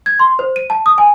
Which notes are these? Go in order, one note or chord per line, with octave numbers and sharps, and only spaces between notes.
G#6
C6
C5
D#7
A5
D#6
G#5